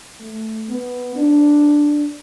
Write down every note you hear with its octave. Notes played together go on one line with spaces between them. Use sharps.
A3
B3
D4